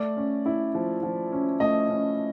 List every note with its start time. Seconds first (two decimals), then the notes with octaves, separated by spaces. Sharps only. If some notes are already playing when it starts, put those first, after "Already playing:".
Already playing: A3 D5
0.17 C#4
0.46 E4
0.75 F3
1.03 F3
1.32 C#4
1.60 A3 D#5
1.90 C#4